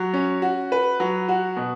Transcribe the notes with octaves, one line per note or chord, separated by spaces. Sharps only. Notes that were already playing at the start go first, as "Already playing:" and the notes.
Already playing: F#3
C#4
F#4
B4
F#3
F#4
B2